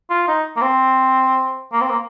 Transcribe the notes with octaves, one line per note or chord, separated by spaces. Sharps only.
F4
D#4
A#3
C4
A#3
C4
A#3